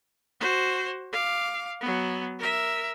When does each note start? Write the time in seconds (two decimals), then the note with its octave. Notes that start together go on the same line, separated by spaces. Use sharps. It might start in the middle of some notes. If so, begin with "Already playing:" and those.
0.40 F#4 C5
1.12 F5 D6
1.81 F#3 B3
2.39 A#4 E5